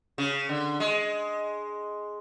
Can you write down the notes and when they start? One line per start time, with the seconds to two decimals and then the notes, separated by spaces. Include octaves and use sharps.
0.18 C#3
0.49 D3
0.80 G#3